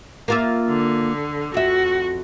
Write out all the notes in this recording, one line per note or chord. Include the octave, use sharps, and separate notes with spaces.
A#3 F4 E5
D3
F2 F#4 E5